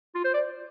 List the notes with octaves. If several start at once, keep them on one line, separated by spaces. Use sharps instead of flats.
F4
C5
D5